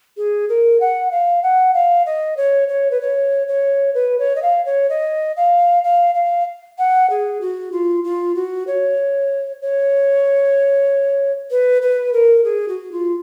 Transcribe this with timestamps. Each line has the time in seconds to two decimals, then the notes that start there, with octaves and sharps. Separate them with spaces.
0.17 G#4
0.49 A#4
0.80 F#5
1.11 F5
1.43 F#5
1.74 F5
2.06 D#5
2.37 C#5
2.68 C#5
2.91 B4
3.01 C#5
3.48 C#5
3.94 B4
4.19 C#5
4.35 D#5
4.42 F5
4.65 C#5
4.89 D#5
5.36 F5
5.84 F5
6.14 F5
6.78 F#5
7.10 G#4
7.41 F#4
7.72 F4
8.04 F4
8.35 F#4
8.67 C#5
9.62 C#5
11.51 B4
11.82 B4
12.13 A#4
12.44 G#4
12.68 F#4
12.91 F4